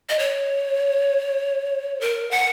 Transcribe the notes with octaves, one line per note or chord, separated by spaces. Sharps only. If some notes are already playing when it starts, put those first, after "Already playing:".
D#5
C#5
A#4
F#5